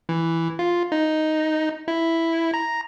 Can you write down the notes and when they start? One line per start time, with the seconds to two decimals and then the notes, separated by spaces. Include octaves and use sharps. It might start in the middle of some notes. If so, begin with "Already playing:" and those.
0.09 E3
0.59 F4
0.92 D#4
1.88 E4
2.54 A#5